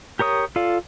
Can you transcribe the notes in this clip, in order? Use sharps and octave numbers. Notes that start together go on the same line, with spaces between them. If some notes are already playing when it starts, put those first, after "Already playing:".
G4 A#4 C#5 D#6
F4 A4 D5 F5